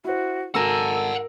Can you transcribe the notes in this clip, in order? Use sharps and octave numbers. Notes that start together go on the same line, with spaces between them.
E4 F#4 C5
G#1 F#4 A4 A#4 F#5 G#5 A5 E6